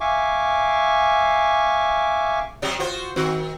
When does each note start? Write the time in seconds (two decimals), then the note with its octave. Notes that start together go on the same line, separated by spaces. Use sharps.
0.01 E5 F5 G#5 C#6 D6
2.62 C3 F#3 G3
2.79 F4 F#4 C5
3.16 D#3 C4 F#4